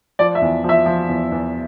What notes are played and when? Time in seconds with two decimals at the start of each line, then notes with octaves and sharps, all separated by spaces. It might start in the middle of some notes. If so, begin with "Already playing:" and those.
0.19 F3 D5
0.35 E5
0.42 E2
0.64 F3 E5
0.86 F3
1.09 E2
1.32 E2